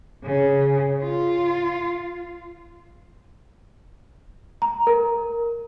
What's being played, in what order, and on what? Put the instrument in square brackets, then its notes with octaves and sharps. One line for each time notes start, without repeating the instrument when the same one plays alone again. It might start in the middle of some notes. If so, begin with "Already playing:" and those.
[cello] C#3
F4
[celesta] A#5
A#4